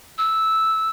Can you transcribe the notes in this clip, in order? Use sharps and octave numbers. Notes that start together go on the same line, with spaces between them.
E6